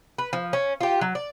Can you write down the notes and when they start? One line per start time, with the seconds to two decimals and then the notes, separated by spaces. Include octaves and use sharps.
0.18 B4
0.33 F3
0.53 C#4
0.81 F4 G4
1.01 F#3
1.15 D5